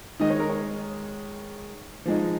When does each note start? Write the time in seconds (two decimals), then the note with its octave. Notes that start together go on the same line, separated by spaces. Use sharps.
0.20 D#3 G#3 D#4 D#5
0.30 C#5
0.40 A#4
0.49 C#5
2.05 F3 G#3 D#4